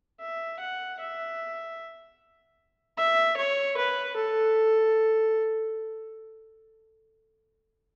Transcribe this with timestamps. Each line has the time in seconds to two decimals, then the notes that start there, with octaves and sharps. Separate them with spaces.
0.20 E5
0.60 F#5
1.00 E5
2.97 E5
3.37 C#5
3.77 B4
4.16 A4